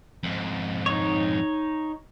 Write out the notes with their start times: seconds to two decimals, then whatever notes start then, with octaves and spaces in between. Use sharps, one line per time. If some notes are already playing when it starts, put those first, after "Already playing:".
0.23 F2 G#2
0.86 D#4 C#5